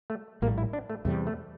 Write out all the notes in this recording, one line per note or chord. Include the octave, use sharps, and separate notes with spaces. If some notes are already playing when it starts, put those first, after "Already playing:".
A3
A#1 A2 G3 A#3
E4
D4
A3
E2 C3 G3 A3
A3